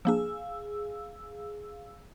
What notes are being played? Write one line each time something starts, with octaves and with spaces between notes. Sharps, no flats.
F3 A#3 D4 G#4 F5 E6